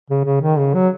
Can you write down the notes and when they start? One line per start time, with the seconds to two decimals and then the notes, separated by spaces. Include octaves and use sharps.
0.10 C#3
0.25 C#3
0.41 D#3
0.58 C#3
0.74 F#3